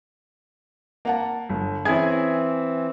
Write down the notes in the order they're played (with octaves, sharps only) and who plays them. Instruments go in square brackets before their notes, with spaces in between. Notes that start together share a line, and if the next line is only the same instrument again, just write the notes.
[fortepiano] A#3 [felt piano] F5 F#5 A5
[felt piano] G1
[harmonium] E3 C4 [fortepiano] C#4 E4 G#4 [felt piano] G#6